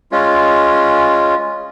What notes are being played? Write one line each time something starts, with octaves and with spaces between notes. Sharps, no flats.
G#3 C#4 F4